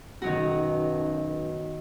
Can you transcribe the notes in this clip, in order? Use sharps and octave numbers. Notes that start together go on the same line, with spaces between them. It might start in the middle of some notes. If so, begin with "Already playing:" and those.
B1 F#2 B2 D#3 F#3 F#4